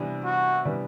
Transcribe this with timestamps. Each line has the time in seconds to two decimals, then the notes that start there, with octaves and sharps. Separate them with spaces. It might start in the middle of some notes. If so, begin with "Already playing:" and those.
Already playing: C3 E3 G3 B3 D4
0.24 F#4
0.65 C3 E3 G3 B3 D4